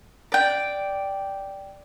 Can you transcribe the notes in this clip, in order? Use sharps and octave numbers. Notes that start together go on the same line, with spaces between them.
D5 G5